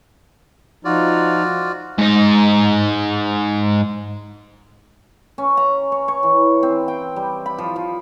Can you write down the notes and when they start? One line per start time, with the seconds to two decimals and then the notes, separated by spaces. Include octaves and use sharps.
0.85 F3 D#4 F4 F#4 D5
1.99 G#2 D#4
5.38 C#4
5.57 A#5
5.92 C#5
6.08 C#5
6.23 E3
6.63 C4
6.88 G5
7.16 G3
7.46 B5
7.58 F3
7.76 F3